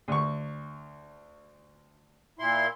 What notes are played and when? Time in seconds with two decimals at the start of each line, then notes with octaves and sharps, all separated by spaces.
0.08 D2 C#6
2.39 A#2 E4 C6